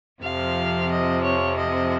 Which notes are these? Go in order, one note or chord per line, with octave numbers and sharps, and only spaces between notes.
F2 C3 F3 F5
D#5
C#5
D#5